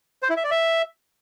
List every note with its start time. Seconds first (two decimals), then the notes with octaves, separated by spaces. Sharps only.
0.23 C5
0.30 E4
0.37 E5
0.44 D5
0.51 E5